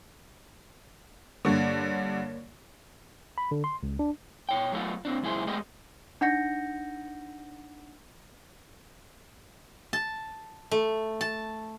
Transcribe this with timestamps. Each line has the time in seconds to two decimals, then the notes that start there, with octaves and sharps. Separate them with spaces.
1.45 G2 D3 A#3 C#5
3.38 B5
3.51 D3
3.64 C6
3.83 C#2
3.99 D4
4.49 B2 C#5 G5
4.72 F#3 G3 A3 B3 F4
5.05 A#2 C4 D4
5.22 C#2 F#2 A#2 E4 G#4 C5
5.47 G#3 A3 B3 G4 D#5
6.21 D4 D#4 F#5 G6 A#6 C#7
9.93 A5
10.71 A3
11.21 A5